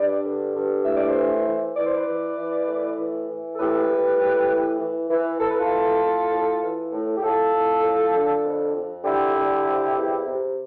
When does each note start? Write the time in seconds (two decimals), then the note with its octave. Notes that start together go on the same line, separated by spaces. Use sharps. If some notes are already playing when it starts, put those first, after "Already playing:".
Already playing: G2 B4 D5
0.24 D3
0.54 G2
0.84 A2 E5
0.96 D5
1.06 C5 E5
1.15 E3
1.45 E3
1.75 E3 D5
1.85 C5
1.94 B4 D5
2.07 E3
2.37 E3
2.67 A2
2.97 E3
3.28 E3
3.54 A4
3.58 A2 G4 B4
3.88 A2
4.19 A2
4.49 E3
4.79 E3
5.10 E3
5.40 E3 A4
5.50 B4
5.60 F4 A4
5.71 A2
6.01 A2
6.32 A2
6.62 E3
6.92 A2
7.16 G4
7.22 A2 F4 A4
7.53 A2
7.83 A2
8.14 D3
8.43 F2
8.74 F2
9.04 D3 E4 G4
9.35 D3
9.65 F2
9.96 E2
10.26 C3